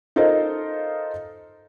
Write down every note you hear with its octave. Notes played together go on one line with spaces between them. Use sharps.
D#4 F4 A4 A#4 C5 D#5